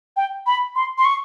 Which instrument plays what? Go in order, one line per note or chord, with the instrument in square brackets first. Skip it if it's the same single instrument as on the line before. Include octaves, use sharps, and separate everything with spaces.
[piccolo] G5
B5
C6
C6
C#6